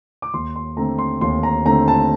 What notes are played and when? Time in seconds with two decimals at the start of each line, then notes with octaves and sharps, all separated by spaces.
0.22 D6
0.34 D#2 C6
0.56 C6
0.77 D3 A3 C4 A#5
0.99 C6
1.21 D#2 C6
1.43 A#5
1.65 D3 A3 C4 A#5
1.88 A5